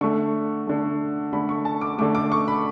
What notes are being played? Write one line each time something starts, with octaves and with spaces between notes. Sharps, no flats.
D3 A3 C#6
D3 A3
D3 A3 B5
C#6
A5
D6
D3 A3 D6
D6
C#6
B5